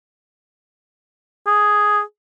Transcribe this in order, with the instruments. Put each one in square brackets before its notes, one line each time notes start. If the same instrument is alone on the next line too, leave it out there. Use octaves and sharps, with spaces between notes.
[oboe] G#4